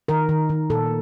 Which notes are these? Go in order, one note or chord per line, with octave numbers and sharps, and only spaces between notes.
D#3 A#4
D#3
D#3
A#2 A4